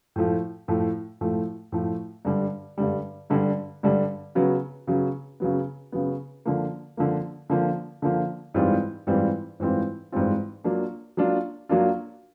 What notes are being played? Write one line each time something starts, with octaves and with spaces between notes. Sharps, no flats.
A2 F3 A3
A2 F3 A3
A2 F3 A3
A2 F3 A3
G2 D3 G3
G2 D3 G3
G2 D3 G3
G2 D3 G3
C#3 F#3 B3
C#3 F#3 B3
C#3 F#3 B3
C#3 F#3 B3
D3 F3 A#3
D3 F3 A#3
D3 F3 A#3
D3 F3 A#3
G#2 E3 G3 C4 F4
G#2 E3 G3 C4 F4
G#2 E3 G3 C4 F4
G#2 E3 G3 C4 F4
F#3 A#3 D4 F4
F#3 A#3 D4 F4
F#3 A#3 D4 F4